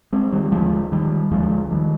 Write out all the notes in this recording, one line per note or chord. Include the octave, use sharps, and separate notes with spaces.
G#3 C4
D#3 G3
D#2 D3 F3 G#3
D#3 G3
D#2 D3 F3 G#3
D#3 G3